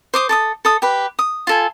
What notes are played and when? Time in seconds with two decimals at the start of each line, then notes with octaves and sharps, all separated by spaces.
0.14 C5 D6 D#6
0.29 A4 D6 D#6
0.65 A4 D#6
0.82 G4 B4
1.19 D#6
1.47 F4 A4 G#5